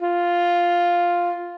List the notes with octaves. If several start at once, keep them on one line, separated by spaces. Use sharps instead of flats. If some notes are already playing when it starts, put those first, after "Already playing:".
F4